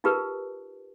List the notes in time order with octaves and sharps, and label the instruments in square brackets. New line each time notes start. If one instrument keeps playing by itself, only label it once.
[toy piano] D#4 F4 G4 A#4 B4